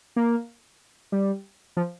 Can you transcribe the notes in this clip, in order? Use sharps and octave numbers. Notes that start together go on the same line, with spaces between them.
A#3
G3
F3